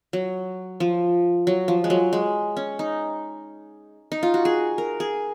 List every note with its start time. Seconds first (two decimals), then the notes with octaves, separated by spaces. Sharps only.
0.13 F#3
0.80 F3
1.47 F#3
1.68 F3
1.84 G#3
1.90 F#3
2.13 G#3
2.57 C#4
2.79 D#4
4.12 D#4
4.23 F4
4.34 F#4
4.45 G#4
4.78 A#4
5.00 G#4